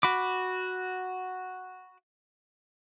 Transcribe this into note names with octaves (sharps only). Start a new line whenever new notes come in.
F#4 B5 D6